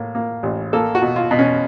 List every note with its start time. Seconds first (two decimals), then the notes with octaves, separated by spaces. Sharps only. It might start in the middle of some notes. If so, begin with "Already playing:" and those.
Already playing: A2 A#3
0.15 A#3
0.43 A1
0.73 A#3 A4
0.95 F#4
1.02 B2
1.16 F4
1.31 B2
1.39 C#4